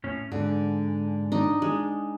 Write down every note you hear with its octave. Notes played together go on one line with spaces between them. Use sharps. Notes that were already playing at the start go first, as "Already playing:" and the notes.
A2 C#4
G#2 D3
D4 D#4 D#5
G#3